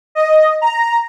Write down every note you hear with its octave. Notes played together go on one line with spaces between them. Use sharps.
D#5
A#5